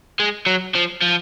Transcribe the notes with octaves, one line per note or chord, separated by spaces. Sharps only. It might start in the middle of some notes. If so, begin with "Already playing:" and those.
G#3
F#3
F3
F3